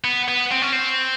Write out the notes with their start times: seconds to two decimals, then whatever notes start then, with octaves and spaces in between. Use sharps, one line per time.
0.04 B3
0.28 B3
0.52 C4
0.62 C#4
0.73 C4